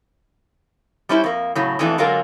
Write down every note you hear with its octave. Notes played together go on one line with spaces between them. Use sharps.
G3 C#4 E4 C5
F2 A#3
A2 C#3 F#3
F2 B2 E3 A3 D4
D3 F#3 G#3 A#3 F4 A#4